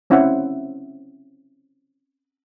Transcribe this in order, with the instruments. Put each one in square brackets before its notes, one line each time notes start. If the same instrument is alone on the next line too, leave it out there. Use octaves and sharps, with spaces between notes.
[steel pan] C4 C#4 E4 C5 E5 F#5